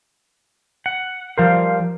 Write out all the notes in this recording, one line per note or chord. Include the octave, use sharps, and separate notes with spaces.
F#5
F3 G3 A#4 C5 F5